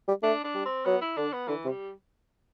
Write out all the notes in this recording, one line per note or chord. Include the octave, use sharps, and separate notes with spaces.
G3
A3 D4
D4
G3
C4
F#3 B3
E4
D3 D4
B3
D3 E3
C3
G3